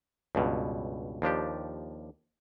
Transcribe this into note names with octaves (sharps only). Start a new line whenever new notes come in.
C#2 G2 B2
D#2 F3 D4 G4